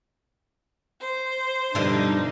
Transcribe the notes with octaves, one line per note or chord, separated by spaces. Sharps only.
C5
G2 B2 D3 F3 G3 D#4 E4